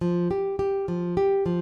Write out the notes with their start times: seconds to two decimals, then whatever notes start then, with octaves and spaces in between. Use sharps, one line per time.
0.01 F3
0.31 G4
0.59 G4
0.88 F3
1.17 G4
1.46 F3